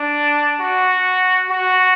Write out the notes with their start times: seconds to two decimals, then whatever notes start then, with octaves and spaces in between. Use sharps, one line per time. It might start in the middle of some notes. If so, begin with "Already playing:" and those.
Already playing: D4
0.60 F#4
1.50 F#4